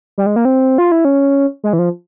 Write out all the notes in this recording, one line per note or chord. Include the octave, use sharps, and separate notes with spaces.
G3
G#3
A#3
C4
F4
E4
C#4
G#3
E3
F3